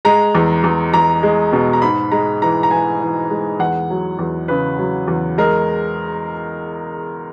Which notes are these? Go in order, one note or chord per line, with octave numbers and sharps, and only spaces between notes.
G#3 A#5
E2
E2
E2 A#5
G#3
B2
A#5
G#2 B5
G#3 A#5
E3 A#5
A#5
E3 G#5
E3
G#3
E2 F#5
F#3
E2
C#3 B4
F#3
E2
G#3 A#4